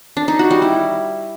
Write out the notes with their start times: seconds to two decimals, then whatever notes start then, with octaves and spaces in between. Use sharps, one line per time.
0.17 D4
0.28 D#4
0.39 F#4
0.51 G3
0.62 E4